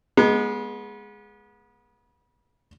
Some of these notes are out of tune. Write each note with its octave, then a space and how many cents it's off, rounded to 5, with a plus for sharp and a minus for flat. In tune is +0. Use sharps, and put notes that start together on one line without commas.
G#3 +0 B3 -35